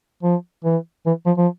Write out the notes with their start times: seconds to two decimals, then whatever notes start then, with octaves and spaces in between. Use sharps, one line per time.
0.23 F3
0.64 E3
1.06 E3
1.26 F3
1.38 F3